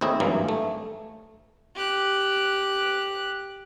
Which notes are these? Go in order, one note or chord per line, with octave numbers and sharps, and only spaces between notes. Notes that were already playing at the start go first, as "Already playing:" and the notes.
D#2 A2 C4 E4 G#4 D#5
G#1 G2 E3 F#3 A#3 G#5
A3
G4 F#6